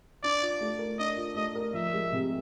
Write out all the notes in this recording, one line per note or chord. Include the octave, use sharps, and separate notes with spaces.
D4 D5
F4
A3
A#4
D4 D#5
F4
A3 D#5
A#4
F3 E5
G#3
C3